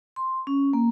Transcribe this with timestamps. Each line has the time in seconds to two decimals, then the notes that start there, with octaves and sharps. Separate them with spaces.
0.16 C6
0.47 C#4
0.73 A#3